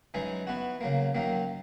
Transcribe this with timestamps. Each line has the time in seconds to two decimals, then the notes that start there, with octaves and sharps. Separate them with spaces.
0.14 F#2 E3 G#3 D#4 G#4
0.47 E3 B3 F#4
0.81 C#3 F#3 A#3
1.15 F#2 D#3 F#3 A#3